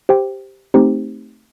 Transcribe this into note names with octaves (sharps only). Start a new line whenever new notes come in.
G4 C5 G5
A3 C4 D#4 G4 C5